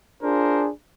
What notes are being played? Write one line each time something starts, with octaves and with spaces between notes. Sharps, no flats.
D4 F4 G#4 A#4 C5